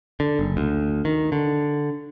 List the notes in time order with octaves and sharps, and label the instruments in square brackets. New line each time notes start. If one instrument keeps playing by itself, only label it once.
[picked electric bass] D3
F#1
D2
D#3
D3